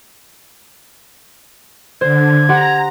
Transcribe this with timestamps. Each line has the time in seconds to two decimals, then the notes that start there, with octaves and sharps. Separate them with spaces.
2.01 D3 C5 G#6
2.49 G4 F#5 A#5 C6